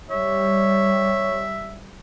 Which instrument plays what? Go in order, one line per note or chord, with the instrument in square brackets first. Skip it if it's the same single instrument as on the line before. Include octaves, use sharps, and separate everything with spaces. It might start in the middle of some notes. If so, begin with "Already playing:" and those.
[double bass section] G3 [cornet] C#5 [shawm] E5